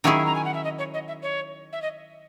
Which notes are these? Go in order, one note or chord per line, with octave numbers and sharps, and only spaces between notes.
D#3 F#3 C#4 E4 G#4 E5
A#5
G#5
F#5
E5
D#5
C#5
D#5
E5
C#5
E5
D#5